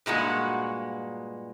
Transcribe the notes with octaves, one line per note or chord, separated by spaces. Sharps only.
G2 A#2 G#3 F#4